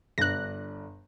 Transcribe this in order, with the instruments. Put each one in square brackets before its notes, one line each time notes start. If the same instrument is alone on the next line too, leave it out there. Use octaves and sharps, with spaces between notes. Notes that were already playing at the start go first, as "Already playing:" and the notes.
[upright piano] G1 D4 [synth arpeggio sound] F#6 A#6